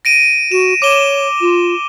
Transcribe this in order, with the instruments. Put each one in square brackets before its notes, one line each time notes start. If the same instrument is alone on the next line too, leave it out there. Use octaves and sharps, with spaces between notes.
[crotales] A#6 D7 D#7
[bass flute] F#4 [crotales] E7
[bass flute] C#5 [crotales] D6 E7 G7
[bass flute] F4